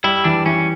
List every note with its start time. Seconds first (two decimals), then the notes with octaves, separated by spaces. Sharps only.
0.04 G3 E4
0.24 E3 D4
0.46 E3 C#4